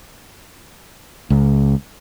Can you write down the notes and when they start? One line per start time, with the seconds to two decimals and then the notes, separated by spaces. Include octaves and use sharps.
1.30 C#2